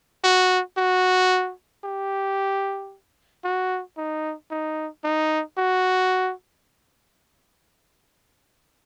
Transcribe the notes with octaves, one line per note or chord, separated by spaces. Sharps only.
F#4
F#4
G4
F#4
D#4
D#4
D#4
F#4